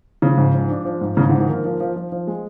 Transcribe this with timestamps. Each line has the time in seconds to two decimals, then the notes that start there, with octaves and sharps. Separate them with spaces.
0.22 C#3 F3
0.38 G#2
0.54 F3
0.69 D4
0.85 F3
1.01 G#2
1.17 G#2 C#3
1.29 D3
1.32 F3
1.40 D#3
1.48 A#3
1.65 F3
1.80 F3
1.96 F3
2.12 F3
2.27 G#3